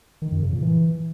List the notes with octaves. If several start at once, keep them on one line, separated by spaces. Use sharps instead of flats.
D#3
F#2
C#3
A#2
E3